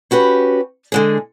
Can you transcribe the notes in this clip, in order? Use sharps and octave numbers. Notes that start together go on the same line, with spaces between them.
C#4 F#4 G4 B4
D3 G#3 G#4